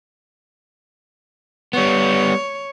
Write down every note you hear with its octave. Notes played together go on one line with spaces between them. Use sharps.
G3 B3 C#5